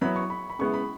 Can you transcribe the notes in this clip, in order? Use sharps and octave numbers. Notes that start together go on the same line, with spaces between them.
F#3 B3 E4 B5
C#6
B5
B5
C#3 G#3 B3 E4 C#6
B5